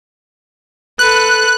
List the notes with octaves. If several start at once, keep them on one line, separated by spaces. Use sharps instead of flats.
A4 B4 F#6